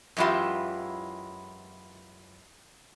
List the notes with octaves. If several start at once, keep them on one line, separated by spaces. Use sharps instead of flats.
F#2 E3 G#3 E4 F4 G4